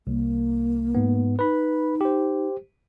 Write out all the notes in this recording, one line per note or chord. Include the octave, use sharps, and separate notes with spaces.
C2 A#3
G#2 B3
D#4 B4 B5
G4 C5